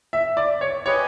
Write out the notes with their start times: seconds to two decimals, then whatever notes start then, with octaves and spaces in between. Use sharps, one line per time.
0.13 E5
0.37 D5
0.61 C#5
0.86 G4 B4 C#5 D#5 G#5